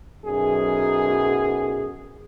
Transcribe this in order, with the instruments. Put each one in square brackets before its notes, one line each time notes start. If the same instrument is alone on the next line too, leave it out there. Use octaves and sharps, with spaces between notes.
[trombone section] B1 F#2 G#4